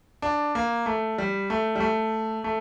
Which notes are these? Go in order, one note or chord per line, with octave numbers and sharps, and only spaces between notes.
D4
A#3
A3
G3
A3
G3
A3
A3